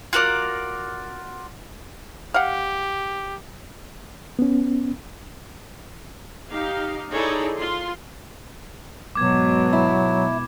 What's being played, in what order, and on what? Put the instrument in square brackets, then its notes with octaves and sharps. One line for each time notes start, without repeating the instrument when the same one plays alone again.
[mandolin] F4 F#4 A#4 D5
[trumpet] G4 [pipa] F5 F#5
[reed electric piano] B3 C#4
[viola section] D#4 G4 F5
D#4 E4 G#4 A4 C#5 D5
F4 C6
[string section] G#2 B2 [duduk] F#3 [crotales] D6 G#6
[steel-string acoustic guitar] E4